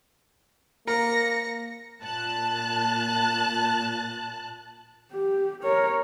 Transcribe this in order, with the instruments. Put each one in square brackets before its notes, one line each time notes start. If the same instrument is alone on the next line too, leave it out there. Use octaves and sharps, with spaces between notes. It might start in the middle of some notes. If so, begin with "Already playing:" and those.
[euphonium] A#3 [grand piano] A#4 [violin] A#6 C#7
[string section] A#2 A5 F#6
[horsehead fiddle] G4
A#4 C#5